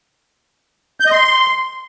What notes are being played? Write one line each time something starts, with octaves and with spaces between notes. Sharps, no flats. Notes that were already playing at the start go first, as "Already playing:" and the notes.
G6
D#5
C6